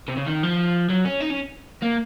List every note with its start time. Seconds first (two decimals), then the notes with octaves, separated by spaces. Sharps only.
0.08 C3
0.17 C#3
0.27 D#3
0.43 F3
0.89 F#3
1.05 C#4
1.21 D#4
1.31 C#4
1.83 A#3